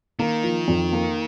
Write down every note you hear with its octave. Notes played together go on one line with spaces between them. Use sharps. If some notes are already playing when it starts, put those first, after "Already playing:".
D#3 A#3
F3
F2
A#3